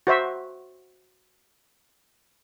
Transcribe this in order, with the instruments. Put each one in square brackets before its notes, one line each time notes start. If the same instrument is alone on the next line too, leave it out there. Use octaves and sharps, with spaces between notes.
[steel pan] F#4 C5 E5